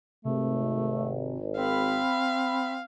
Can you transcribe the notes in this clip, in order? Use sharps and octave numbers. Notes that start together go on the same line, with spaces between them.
G#1 C3 A3
C4 F5 B5